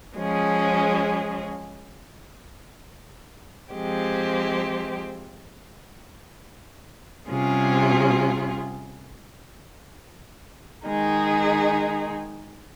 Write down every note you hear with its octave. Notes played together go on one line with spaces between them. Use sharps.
F3 G#3 C#4 G#4
F3 G#3 C4 G4
C3 G3 C#4 F4 G#4
D#3 G#3 D#4 G#4